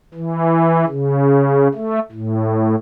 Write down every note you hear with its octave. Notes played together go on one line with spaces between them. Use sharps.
E3
C#3
A3
A2